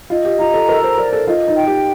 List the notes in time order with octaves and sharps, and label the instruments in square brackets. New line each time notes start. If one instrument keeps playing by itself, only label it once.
[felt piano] F4 [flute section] D#5
[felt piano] G4
[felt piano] F4 [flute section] A#5
[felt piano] A4
[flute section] A4 [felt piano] A#4
[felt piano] C5
[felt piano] A#4 [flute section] D5
[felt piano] A4
[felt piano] F4 [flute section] D#5
[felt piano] D#4
[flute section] G5
[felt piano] G4